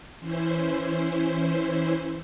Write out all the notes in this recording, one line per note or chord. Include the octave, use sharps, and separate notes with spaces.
E3 C#4 E4 C5